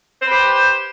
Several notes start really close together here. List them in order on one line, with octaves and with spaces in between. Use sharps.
C5 B4 G4